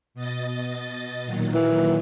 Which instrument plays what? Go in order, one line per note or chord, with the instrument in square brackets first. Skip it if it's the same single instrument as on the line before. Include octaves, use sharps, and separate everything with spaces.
[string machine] B2 D#5 A6
A#2 D#3 F#3
[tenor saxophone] E3